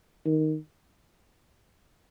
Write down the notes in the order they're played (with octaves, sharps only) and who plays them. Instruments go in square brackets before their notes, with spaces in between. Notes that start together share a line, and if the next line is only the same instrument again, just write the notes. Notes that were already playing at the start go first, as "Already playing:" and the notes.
[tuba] D#3